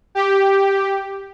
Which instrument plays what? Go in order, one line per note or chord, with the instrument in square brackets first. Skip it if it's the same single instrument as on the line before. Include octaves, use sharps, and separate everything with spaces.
[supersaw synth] G4